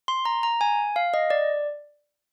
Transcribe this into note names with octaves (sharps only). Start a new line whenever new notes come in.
C6
A#5
A#5
G#5
F5
D#5
D5